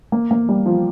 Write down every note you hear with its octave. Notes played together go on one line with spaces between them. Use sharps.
A#3
A#3
G3
F3